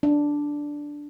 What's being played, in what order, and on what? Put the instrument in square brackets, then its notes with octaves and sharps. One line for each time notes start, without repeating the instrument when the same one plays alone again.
[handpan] D4